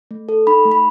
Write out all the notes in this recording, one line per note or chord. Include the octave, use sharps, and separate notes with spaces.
A3
A4
D#4 B5
A3
B5